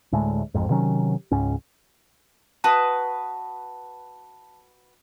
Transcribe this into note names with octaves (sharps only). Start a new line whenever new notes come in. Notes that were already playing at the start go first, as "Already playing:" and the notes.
D2 A2 G#3 A3
A1 F2 G#2
C3 D#3 F#3 C#4
C#2 G#2 C#4
F#4 B4 A5 D#6